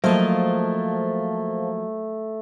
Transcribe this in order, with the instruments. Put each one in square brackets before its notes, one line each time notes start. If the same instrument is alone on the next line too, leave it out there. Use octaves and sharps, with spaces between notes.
[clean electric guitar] F3 A#3 [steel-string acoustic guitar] F#3 D#5 [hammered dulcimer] A3 [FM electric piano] C5 F5 A5